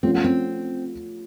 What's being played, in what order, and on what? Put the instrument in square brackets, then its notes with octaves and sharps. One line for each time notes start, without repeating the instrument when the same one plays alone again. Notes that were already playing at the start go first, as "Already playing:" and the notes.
[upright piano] F3 A3 C#4 F4 [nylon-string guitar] C4
[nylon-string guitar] B3
C4